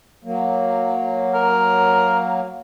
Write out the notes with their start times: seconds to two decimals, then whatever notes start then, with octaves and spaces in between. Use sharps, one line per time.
0.24 F#3 A#3
1.35 A#4